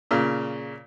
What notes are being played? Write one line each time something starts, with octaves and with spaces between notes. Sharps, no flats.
A#2 C#3